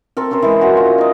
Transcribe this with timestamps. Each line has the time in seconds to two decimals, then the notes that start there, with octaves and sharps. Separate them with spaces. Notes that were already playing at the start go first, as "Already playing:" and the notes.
0.17 C4 A4 A#4
0.31 C#4 G4 A#4 C5
0.42 E3 G#3
0.61 F#4 C#5 A#5
0.77 F4
0.98 D#4 D#5